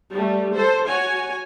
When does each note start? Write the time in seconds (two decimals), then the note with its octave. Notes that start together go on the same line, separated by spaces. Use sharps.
0.14 G3 A3
0.55 A4 C5
0.87 F#4 C#5 G#5